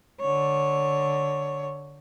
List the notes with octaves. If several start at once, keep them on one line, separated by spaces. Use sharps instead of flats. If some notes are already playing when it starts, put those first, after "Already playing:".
D3 C#5